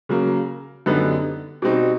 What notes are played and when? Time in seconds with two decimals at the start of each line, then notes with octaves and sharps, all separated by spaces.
0.09 C#3 F#3 A#3
0.86 F#2 D3 G3 B3 D#4
1.62 B2 G3 C4 D#4